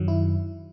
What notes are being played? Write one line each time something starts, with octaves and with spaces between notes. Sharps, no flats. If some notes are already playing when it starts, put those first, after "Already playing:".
Already playing: F#2 D#3 F#3
E4